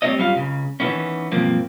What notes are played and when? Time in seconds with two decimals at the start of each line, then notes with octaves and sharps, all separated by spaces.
0.02 G3 A3 C4 E4 C#5 D#5
0.18 F#2 G3 C#4 F4 F5
0.35 C#2 C#3
0.80 D#3 E3 F#3 G#3 B3 C#4
1.32 B1 G2 F3 A#3 C4